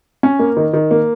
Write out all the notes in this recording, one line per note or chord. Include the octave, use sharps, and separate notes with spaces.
C#4
A#3
D#3
D#3
A#3